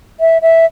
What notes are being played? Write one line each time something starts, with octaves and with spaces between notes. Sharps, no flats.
E5
E5